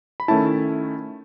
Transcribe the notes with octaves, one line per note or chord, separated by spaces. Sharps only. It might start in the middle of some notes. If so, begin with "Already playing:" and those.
B5
D#3 A3 C#4 E4 A5